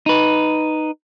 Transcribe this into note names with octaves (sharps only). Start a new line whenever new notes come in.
D#4 B4